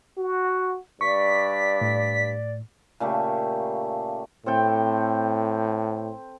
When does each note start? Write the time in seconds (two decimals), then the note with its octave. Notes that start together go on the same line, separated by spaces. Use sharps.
0.18 F#4
1.01 G2 D5 C#6 B6
1.81 A2
3.00 A#2 C#3 A3 G4
4.46 A2 C4 A4 G5